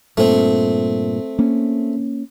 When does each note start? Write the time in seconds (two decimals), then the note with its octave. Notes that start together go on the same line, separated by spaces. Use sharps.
0.17 G2 A#2 A3 C4
1.39 A#3 C#4